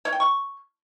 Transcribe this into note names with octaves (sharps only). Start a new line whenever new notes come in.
C#5
G5
C#6